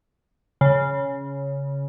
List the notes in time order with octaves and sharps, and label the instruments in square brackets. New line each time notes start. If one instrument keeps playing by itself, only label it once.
[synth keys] C#3